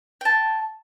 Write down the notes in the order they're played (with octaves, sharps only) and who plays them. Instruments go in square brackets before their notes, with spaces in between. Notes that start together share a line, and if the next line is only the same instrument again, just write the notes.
[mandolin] G5 A5